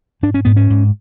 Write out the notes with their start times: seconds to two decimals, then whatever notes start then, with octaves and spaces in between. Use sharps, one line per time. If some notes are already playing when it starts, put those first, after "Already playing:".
0.23 G#2 D4
0.34 C#4
0.45 G#2 B3
0.57 C#4
0.70 G#2